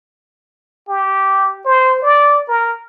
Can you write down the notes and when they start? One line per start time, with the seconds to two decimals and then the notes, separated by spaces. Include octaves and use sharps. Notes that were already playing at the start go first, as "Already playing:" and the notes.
0.89 G4
1.65 C5
2.02 D5
2.49 A#4